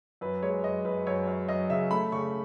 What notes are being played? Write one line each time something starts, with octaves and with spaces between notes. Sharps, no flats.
F#2 B4
G#3 C#5
F#2 D#5
F#2 B4
F#2 C#5
F#2
F#2 D#5
C#3 E5
A3 B5
C#3 C#6